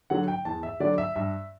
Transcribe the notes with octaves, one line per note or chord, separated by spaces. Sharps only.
D3 F#3 F#5
G5
E2 A5
E5
D3 F#3 D5
E5
G2 E5